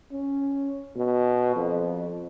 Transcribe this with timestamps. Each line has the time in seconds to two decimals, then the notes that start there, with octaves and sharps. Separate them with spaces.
0.11 C#4
0.96 B2
1.56 F2